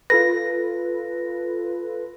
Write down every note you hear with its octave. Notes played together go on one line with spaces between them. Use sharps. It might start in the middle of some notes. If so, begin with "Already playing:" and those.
F4 A4 B4 A#6